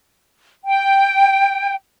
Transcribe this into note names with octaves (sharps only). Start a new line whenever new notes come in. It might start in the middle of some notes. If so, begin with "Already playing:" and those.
G5